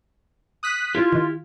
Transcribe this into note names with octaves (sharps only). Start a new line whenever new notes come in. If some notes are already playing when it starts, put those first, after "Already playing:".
D#6 F#6 B6
E4 F4 G4
D#3